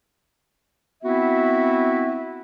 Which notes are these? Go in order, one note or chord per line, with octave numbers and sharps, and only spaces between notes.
B3 C4 E4 F#4 E5